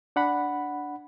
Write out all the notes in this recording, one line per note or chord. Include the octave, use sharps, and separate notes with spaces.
D4 F#5 B5